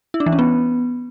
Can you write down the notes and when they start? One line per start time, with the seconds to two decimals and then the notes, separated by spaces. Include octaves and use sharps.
0.14 E4
0.20 D4
0.26 E3
0.33 C#4
0.39 B3